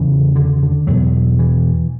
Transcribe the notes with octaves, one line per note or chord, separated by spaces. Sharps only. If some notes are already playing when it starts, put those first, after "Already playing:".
Already playing: E2 C#3 E3
D3
D3
E2 B2 F#3
E3